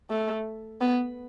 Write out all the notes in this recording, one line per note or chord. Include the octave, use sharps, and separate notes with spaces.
A3
B3